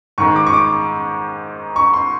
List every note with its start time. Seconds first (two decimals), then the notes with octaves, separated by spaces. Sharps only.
0.18 G#2 D#3 G#3 C#6
0.36 D6
0.46 C#6
0.53 D6
1.76 C#6
1.94 C6